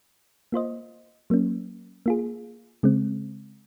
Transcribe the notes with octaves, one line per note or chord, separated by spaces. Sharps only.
A#3 F4 C5 D#5
F#3 A#3 C#4
A#3 F4 G#4
C#3 G#3 C4